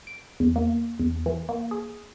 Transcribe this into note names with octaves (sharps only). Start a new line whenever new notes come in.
D7
E2
A#3
E2
E3
A#3
G#4